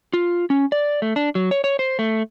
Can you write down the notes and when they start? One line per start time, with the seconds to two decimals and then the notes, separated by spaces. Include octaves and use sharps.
0.13 F4
0.50 C#4
0.72 D5
1.02 A3
1.16 D4
1.35 F#3
1.51 C#5
1.64 C#5
1.79 C5
1.99 A3